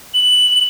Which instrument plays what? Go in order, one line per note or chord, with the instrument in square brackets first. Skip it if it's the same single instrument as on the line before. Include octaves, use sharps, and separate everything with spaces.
[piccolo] F#7